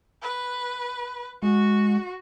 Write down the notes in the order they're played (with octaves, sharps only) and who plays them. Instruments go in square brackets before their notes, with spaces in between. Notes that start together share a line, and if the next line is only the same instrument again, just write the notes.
[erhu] B4
[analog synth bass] G#3 [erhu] F#4